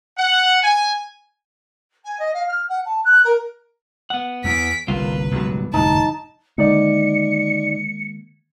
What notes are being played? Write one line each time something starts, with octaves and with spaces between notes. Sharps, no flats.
F#5
G#5
G#5
D#5
F5
F6
F#5
A5
F#6
A#4
B3 F#5
E2 B6 D7
G1 C2 A#3 F4 B4
G#1 C#2 B2 F#3 G3 B3
G1 C2 F2 A2 D#4 A5
D3 D#3 G#3 A#3 D#4 D5 C#7